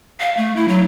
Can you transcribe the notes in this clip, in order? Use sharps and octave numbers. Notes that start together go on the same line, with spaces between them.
F5
A3
E4
F#3